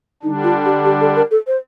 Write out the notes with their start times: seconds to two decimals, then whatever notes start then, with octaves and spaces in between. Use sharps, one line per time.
0.23 D3 G3 D4 D#4
0.43 F4
0.65 G4
0.85 G4
1.01 A4
1.16 A#4
1.31 A4
1.47 C5